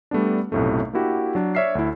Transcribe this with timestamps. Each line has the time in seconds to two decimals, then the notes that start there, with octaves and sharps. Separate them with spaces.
0.11 G3 A3 B3 D4
0.52 B1 F#2 A2 C3 A3
0.93 A#3 D4 E4 F#4 G4
1.35 F#3 D4
1.55 C#5 D5 E5 F6 C7
1.75 D2 E4